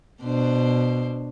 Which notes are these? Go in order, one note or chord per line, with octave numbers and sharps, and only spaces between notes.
B2 D4 C5